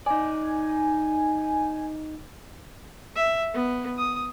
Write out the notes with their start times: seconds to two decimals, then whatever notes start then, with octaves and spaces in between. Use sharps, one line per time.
0.06 D#4 D5 G#5
3.15 E5
3.54 B3
3.98 D#6